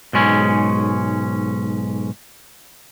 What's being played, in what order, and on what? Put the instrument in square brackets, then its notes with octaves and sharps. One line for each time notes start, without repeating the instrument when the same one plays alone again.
[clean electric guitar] B1 G#2 G#3 C#4